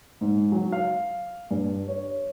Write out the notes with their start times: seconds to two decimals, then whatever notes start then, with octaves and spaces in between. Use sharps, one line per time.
0.21 G#2
0.52 F#3
0.72 F5
1.51 G2
1.88 C#5